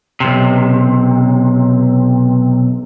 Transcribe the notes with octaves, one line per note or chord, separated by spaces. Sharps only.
B1 C3